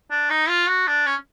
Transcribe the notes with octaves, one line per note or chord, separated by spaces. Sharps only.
D4
D#4
F4
F#4
D4
C#4